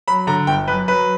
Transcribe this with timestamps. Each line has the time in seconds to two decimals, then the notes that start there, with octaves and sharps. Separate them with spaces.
0.08 F#3 B5
0.27 D3 A#5
0.47 G1 G5
0.68 F#2 B4
0.88 F#3 B4